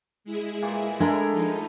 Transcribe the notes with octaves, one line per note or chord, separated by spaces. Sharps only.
G#3 E4 G#4
A#2 E3 D6
D3 G#3 D4 E4 A#4 A5
F3 D#4